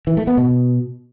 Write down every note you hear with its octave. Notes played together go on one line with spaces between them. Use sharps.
E3
A3
B3
B2